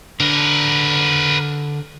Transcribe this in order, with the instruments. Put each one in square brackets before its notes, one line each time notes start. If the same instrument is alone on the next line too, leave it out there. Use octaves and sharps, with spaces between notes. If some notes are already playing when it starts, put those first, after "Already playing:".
[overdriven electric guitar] D3 [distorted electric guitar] A#4 B4